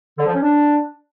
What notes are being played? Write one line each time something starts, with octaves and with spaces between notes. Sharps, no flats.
D3
F3
C#4
D4